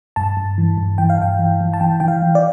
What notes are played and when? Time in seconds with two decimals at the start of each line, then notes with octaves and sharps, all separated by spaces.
0.16 G2 A5
0.37 G2
0.58 E3
0.78 G2
0.98 E3 G5
1.10 F5
1.19 G2 G5
1.39 E3
1.61 E3
1.73 A5
1.80 E3 G5
2.00 E3 G5
2.08 F5
2.22 E3
2.35 D5